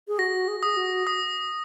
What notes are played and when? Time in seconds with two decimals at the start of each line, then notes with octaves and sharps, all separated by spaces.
0.08 G#4
0.19 F#4 A#6
0.48 G#4
0.63 G#4 D#6
0.77 F#4
1.07 D#6